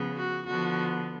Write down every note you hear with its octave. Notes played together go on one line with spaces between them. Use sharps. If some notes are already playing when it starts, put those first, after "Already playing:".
Already playing: C#3 F3 B3
F#4
D3 F3 B3 F#4